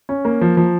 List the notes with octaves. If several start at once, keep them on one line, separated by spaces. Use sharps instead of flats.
C#4
A#3
F3
F3